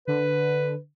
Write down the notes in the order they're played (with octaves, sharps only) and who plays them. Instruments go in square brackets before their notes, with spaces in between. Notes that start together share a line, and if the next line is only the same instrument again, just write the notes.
[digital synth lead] D3 [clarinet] B4